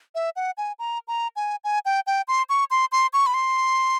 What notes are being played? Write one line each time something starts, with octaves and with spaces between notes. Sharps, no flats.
E5
F#5
G#5
A#5
A#5
G#5
G#5
G5
G5
C6
C#6
C6
C6
C#6
B5
C6